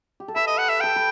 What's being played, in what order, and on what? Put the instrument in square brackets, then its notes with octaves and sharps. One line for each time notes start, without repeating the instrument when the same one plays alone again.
[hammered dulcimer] G4
A4
[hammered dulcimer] B4 [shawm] E5
[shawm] D#5
F#5
E5
[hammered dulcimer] A4 [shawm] G5
[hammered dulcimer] B4